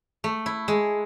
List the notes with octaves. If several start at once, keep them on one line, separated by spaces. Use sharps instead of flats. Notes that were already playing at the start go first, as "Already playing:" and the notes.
A3
E4
G#3